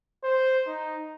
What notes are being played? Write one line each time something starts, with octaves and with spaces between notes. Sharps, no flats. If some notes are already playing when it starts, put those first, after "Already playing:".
C5
D#4